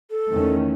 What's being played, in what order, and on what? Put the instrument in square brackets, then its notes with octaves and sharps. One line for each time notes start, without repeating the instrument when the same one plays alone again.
[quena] A4
[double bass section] E2 D#3 A3 C#4